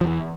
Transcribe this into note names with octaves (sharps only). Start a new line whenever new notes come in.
E2 E3 F3